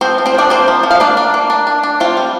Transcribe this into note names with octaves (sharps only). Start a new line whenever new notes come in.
F3 C4 C5
F3
C4 C5
F3 D4 D5
A#3 C4 C5
F3
F3
F5
A#3 D4 D5
D4
A#3
D4
D4
D4
C4 F4 F5
G3